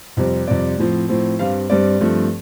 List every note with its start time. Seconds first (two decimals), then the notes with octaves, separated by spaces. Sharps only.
0.17 F2 C3 G3 C4
0.47 F2 C3 G3 C4 D5
0.78 A2 F3 C4
1.09 A2 F3 C4
1.39 G2 G3 C4 F5
1.70 G2 G3 C4 D5
2.01 G2 F3 A3 C4